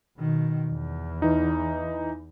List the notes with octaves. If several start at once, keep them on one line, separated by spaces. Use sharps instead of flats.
B2 D#3
E2
E3 D#4